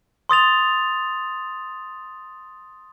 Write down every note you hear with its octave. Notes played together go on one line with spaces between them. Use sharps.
C6 D#6 A6 F7